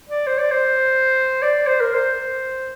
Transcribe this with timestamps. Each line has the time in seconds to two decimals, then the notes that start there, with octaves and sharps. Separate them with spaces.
0.09 D5
0.27 C5
0.39 D5
0.51 C5
1.42 D5
1.67 C5
1.81 A#4
1.94 C5